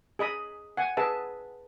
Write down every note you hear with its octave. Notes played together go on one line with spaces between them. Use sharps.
G#4 D#5 B5 D#6
F#5 G#5
G#4 B4 E5 A5